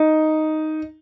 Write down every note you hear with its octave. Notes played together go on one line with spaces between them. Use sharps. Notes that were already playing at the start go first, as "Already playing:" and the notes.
Already playing: D#4